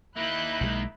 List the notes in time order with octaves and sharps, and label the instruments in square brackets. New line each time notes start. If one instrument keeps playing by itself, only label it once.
[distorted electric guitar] A#3 D#4 [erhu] E4 [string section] B5 F#6 G6
[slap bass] B1 F3 G#3